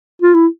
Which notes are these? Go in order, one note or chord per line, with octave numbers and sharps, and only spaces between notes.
F4
E4